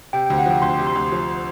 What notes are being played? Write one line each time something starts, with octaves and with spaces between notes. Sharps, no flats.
C3 G5
D2 G5
F#5
F3 G5
D2 C6
C3
C6
D2
F3